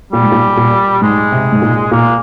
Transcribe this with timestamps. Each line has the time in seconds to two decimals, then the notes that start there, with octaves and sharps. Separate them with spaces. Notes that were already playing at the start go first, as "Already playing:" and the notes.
0.12 A#2 G3
0.22 G#2
0.32 A#2
0.57 A#2
1.02 G#2 G#3
1.32 C3
1.52 G#2
1.62 A#2
1.91 A#2 A#3